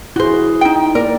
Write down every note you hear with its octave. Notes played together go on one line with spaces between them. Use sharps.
E4 F#4 G#4 C5
D#4 G5
A#3 A#4 D5